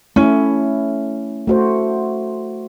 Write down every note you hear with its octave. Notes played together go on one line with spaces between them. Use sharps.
A3 C#4 E4
A3 F#4 C5